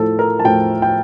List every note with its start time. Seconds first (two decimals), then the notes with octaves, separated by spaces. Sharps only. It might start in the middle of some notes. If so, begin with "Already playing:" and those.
Already playing: A2 F3 A3 A4
0.19 A#4
0.39 A5
0.44 A2 F3 A3 G5
0.82 G5